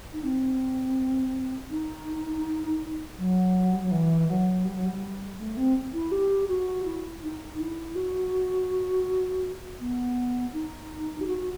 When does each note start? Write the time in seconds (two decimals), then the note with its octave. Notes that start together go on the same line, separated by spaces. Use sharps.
0.12 D#4
0.23 C4
1.70 D#4
3.17 F#3
3.72 G3
3.82 F#3
3.91 E3
4.28 F#3
4.64 G3
4.75 F#3
4.86 G3
5.38 A3
5.56 C4
5.93 E4
6.11 G4
6.48 F#4
6.85 E4
7.22 D#4
7.59 E4
7.95 F#4
9.79 B3
10.53 D#4
11.20 G4
11.26 F#4